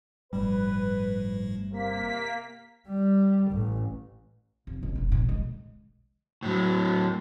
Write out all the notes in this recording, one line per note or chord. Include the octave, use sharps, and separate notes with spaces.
G1 A2 F3 G3 A3 B4
C3 A#3 B6
G3
A1
F1
C#2 B2
F1 E3
A#2 D3
D3 G#3
A2 F#3